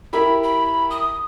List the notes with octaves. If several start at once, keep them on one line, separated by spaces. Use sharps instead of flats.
E4 G4 A#4 B5
B5
D#6